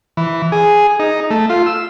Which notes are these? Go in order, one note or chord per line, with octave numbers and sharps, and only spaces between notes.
E3
G#4
D#4
A3
F4
E6